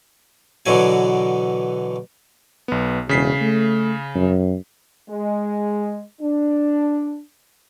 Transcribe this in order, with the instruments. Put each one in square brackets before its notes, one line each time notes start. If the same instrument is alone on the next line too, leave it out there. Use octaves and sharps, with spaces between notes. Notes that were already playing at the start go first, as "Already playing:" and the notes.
[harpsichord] B2 D3 E3 F#3 G#5
[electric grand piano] B1 B3
[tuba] E1 [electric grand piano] C#3 B6 C7
[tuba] A3
F#2
[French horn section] G#3
D4